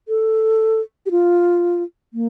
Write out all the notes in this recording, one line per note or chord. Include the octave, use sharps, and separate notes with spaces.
A4
G4
F4
A#3